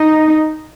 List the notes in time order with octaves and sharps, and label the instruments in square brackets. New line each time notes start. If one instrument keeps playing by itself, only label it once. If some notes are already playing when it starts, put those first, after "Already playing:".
Already playing: [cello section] D#4